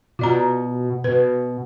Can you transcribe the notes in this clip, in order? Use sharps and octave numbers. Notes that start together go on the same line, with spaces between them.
B2 F4 D5 A#5
B2 B4